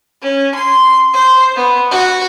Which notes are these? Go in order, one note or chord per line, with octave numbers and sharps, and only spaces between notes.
C#4
C6
C5
B3
F#4